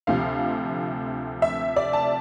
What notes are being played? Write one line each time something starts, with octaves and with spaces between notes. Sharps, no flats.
D2 C3 F3 F5
E5
D5
A5